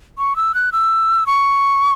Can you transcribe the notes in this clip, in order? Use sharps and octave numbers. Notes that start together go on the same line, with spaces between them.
C#6
E6
F#6
E6
C#6